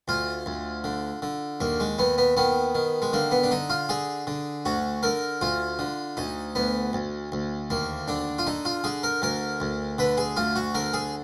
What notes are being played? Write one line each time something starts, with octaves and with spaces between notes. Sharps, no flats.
D2 F4
D2
D3
D3
D#2 A#3
G#3
D#2 B3
B3
D#3 B3
D#3
G#3
D3 A#3
B3
D4
D3 D#4
F4
D3 G#4
D3
D2 F#4
D3 A#4
D2 F4
D3
D2 D#4
D2 B3
D2
D2
D#2 A#3
D3 D4
F4
D3 D#4
F4
D3 G#4
A#4
D2 A#4
D2
D3 B4
G#4
D2 F4
F#4
D3 A#4
G#4